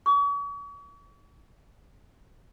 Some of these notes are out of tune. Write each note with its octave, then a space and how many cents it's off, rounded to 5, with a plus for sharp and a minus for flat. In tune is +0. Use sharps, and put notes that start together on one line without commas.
C#6 +40